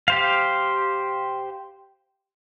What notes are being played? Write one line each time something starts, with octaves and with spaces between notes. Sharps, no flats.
G4 C5 F5